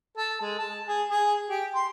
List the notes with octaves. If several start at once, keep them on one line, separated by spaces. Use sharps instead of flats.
A4
G#3
A5
G#4
G#4
G4
C6